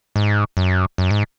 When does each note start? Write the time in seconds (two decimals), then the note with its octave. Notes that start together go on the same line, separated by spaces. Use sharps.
0.16 G#2
0.57 F#2
0.98 F#2
1.11 G#2